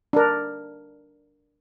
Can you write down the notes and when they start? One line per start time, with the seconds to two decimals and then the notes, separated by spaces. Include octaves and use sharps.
0.13 D4 A#4